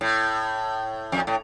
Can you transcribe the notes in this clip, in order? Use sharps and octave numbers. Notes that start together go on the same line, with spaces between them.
A2
F2
A2